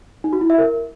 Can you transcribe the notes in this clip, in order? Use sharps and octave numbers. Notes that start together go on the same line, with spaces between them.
D#4
F#4
E4
E5
A#4